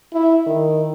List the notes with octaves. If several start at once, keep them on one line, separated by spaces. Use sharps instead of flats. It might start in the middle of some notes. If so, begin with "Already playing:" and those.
E4
D#3